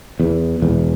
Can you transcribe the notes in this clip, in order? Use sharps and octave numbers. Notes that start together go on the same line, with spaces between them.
E2
E1 E2